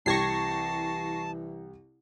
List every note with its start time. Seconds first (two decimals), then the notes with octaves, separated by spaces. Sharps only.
0.06 C2 E3 G4 A5 C#6 G#6 A#6 C7